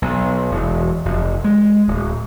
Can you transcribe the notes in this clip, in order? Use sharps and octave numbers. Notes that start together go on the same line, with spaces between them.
B1
E1
F1
G#3
D1